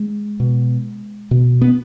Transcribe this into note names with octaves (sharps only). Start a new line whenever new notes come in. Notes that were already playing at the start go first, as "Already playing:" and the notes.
Already playing: G#3
B2
B2
B3